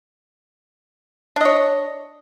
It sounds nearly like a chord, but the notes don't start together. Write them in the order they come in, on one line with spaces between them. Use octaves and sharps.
D4 D#5 C#5